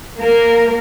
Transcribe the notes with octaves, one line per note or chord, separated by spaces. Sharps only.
A#3 A#4